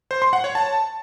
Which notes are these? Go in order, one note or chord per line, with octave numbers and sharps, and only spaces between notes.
C5
C6
F#5
C#5
A5